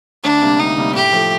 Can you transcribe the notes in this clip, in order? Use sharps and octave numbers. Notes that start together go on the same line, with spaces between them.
D2 D4
C3 G3 A#3
D2 D#4
C3 G3 A#3
A2 G4
F3 A3